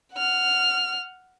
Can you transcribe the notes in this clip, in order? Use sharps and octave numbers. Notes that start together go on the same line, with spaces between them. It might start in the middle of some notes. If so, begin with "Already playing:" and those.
F#5 F6